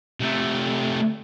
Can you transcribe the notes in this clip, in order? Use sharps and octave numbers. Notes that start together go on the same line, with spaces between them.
C3 A3